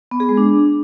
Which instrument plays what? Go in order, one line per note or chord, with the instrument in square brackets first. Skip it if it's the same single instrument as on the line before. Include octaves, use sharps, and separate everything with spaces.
[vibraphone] B3
G#4
G#3
D4